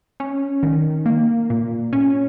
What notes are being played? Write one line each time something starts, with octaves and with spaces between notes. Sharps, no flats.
C#4
D#3
A#3
A#2
C#4